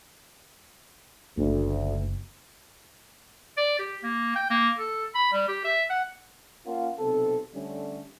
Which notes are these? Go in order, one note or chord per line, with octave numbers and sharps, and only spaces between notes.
F#1 D2
D5
G4
A#3
G5
A#3
A4
B5
G3
G4
E5
F#5
A#3 C#4 F4 A#4 F5 F#5
B1 C3 C4 A4
D3 G3 A3 C#4